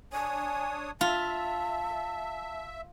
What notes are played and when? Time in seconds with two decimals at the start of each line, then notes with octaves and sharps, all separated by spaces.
0.13 D4 C#5 G#5 D#6
1.01 F4 E5 A5